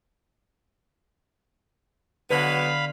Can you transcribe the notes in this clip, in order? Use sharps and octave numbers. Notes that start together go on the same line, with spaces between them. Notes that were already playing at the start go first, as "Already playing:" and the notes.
D3 F#3 G#3 B3 B4 F5 B5